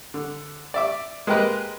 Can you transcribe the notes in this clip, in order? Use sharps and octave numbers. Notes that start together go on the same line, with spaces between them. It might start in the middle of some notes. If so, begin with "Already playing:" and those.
D3
D5 E5 D6
G#3 A#3 G4 A#4 B4 D#5